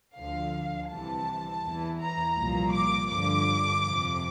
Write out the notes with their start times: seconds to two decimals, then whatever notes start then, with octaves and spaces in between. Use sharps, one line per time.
0.16 D2 D3 F3 F5
0.91 C2 C3 E3 A5
1.63 E2 E3
2.01 A#5
2.36 C2 A#2 F3
2.73 D6
3.10 G2 D3 F3 D6
3.83 F2 C3 F3